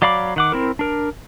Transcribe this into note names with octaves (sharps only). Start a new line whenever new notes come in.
F#3 D5 F5 B5 D6
D#3 F#5 D6
C4 E4 A#4
D4 A#4